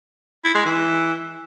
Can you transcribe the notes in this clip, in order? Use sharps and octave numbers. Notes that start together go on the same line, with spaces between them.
E4
G#3
E3